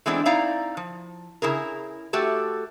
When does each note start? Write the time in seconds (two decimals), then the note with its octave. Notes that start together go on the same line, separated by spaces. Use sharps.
0.06 E3 G#3 A3 B3 C4 D4
0.25 C4 D#4 E4 D5 F5 A#5
0.77 F3
1.42 C#3 E4 G#4 A#4
2.13 A3 F#4 G4 A4